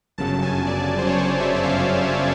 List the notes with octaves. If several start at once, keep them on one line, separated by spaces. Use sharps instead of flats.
G1 F#2 C#3 F#3 A5
G#5
D5
C5
C#5
D5
E5
E5
F5